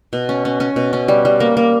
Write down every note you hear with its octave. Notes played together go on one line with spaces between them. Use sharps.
B2
C#4
C#4
C#4
B2
C#4
G3
G3
A#3
A#3